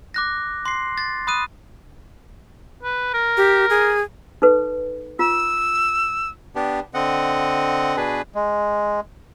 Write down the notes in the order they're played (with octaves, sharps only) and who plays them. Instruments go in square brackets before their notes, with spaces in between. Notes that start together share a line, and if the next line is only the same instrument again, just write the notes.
[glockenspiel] D6 F#6 A#6
C6 C7
A6
B5 D#6 F#6 D#7
[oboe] B4
A#4
[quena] G4
G#4
[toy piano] D#4 A4 B4
[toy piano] F4 [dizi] E6
[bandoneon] B3 D4 G4
D3 C4 D#5 F#5
B2 D4 G#4 B4
G#3